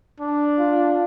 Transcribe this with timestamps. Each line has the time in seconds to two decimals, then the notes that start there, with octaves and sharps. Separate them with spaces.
0.20 D4
0.59 F4